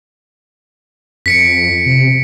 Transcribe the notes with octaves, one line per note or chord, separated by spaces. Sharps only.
F2 B6 C#7 D7
C3